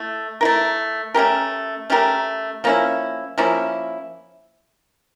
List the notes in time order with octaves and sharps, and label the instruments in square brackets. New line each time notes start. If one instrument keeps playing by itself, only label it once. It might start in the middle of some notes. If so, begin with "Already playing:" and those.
Already playing: [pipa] A3 E4
A3 E4 A#4
A3 C#4 G4 A#4
A3 C#4 G4 A#4
F3 A#3 C#4 E4
F3 A#3 C#4 E4